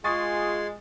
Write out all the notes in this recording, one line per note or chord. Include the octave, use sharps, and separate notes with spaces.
G#3 F4 G#4 C6 C#6 D#6 A6